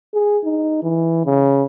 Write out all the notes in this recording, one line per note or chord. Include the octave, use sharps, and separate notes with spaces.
G#4
D#4
E3
C#3